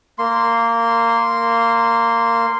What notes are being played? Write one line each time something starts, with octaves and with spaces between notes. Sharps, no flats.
A#3 C6